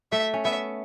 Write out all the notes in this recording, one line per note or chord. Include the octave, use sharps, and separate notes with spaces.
A3 E5
C#4
B3 E5